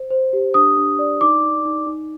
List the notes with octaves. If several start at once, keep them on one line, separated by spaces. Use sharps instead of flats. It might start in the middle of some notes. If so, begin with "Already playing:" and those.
Already playing: C5
C5
G4
D4 D#6
D4
D5
D#4 D6
D#4
D#4
D#4